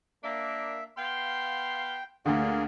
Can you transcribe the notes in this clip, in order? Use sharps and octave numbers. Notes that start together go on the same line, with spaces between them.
A#3 D4 E5
B3 F5 G5 C6
D2 A#2 D3 A#3 G#4